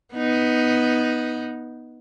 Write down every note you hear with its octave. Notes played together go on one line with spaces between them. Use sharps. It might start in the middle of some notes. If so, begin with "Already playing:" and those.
B3 D#4